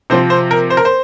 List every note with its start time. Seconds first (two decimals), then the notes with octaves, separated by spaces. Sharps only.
0.10 C3 F3 C4 C5
0.30 C5
0.51 A#4
0.70 C5
0.77 A#4
0.85 C5